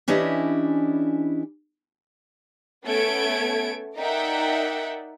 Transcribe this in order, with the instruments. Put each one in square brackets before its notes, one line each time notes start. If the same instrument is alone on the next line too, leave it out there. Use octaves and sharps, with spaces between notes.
[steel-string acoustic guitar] E3 C#4 D4 E4 G4 D#5
[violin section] A3 B3 C#4 A4 G#6 D7
D#4 A#4 D5 E5 F#5 G5